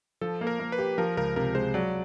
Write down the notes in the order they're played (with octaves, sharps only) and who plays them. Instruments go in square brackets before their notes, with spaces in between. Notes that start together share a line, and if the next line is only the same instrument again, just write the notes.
[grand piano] F3 [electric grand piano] A4
[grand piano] A#3
[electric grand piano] A#4
[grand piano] A#3
[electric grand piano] B4
[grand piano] G4
[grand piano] F3 [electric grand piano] A#4
[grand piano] C#2 [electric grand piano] A#4
[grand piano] C3 [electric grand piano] A#4
[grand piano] G#3 [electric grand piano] C5
[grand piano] F#3 [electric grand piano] D5